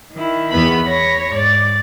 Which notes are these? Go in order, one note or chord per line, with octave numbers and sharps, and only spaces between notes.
D#3 E4
E2 B3 B5
C#5 B5 A#6
G#2 D5 A6